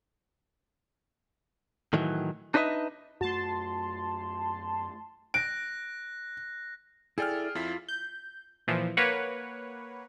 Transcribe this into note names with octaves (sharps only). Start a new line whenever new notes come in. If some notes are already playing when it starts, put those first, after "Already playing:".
A2 D#3 E3 F#3
D4 D#4 B4 C5 D#5 E5
F#2 A3 F#4 A5 C6
F#6 A#6 D7
E4 G#4 A4 D5 G5 F6
F2 E4 F4 B6
G6
A#2 E3 F3
A#3 B4 C#5 F#5